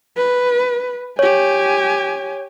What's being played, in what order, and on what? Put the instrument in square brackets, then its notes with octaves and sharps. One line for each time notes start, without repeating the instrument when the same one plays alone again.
[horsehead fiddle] B4
[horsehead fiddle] G4 G#5 [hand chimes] C#5